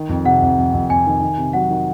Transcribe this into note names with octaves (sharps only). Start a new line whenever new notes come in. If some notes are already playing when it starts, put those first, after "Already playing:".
Already playing: D#3
F2
C3 F#5
F2
F2
F2
F2 G#5
D#3
D#3
C3
F#3 F#5
D#3